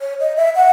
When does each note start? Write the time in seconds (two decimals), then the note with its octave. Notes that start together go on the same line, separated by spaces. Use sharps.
0.01 C#5
0.20 D#5
0.37 E5
0.56 F#5